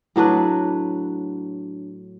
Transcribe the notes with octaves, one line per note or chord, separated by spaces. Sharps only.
A2 F#3 D4 B4